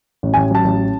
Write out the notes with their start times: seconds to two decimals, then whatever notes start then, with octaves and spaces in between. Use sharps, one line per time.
0.23 A1
0.34 A1 G#5
0.51 F#3 A5
0.64 A1